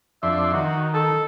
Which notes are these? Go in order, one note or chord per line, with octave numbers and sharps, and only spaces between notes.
F2 D4 E5 C6
D#3 F#4
A4